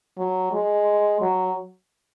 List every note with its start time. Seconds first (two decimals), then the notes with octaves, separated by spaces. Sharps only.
0.18 F#3
0.53 G#3
1.21 F#3